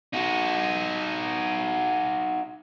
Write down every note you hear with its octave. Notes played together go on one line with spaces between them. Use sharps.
D#4 F#4